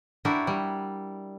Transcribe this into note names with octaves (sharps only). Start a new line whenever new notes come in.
D4 E4 F#4 G4 A#4
G3